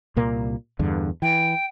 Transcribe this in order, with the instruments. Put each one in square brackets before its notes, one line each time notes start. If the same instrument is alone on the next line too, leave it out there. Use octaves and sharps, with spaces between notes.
[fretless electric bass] C2 A#2 A#3
E2 G2 D3
[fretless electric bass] E3 [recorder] G5